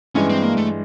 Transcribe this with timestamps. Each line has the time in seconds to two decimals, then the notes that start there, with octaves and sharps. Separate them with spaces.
0.15 G2 E3 G#3 C#4
0.29 C4
0.42 A#3
0.57 A3